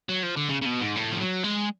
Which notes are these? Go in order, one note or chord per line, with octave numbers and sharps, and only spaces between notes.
F#3
F3
D3
C#3
C#3
B2
G#2
A2
F3
F#3
G#3